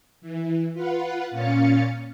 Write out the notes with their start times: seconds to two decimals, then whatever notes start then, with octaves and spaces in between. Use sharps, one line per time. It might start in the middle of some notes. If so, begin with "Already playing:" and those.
0.21 E3
0.73 F4 B4 F#5
1.31 A#2 C#4 F5 A6 C#7